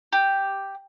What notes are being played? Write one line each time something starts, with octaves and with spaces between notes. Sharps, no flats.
G4